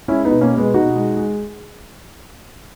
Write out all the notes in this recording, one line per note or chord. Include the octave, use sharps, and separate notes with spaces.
G#3 C#4 E4
B3 D#4
B2
A#3 C#4
B2
G#3 B3
B2 D#4 F#4
G#3
G#3